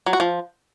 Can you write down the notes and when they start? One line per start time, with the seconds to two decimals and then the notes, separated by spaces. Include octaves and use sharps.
0.06 F#3
0.13 F#4
0.20 F3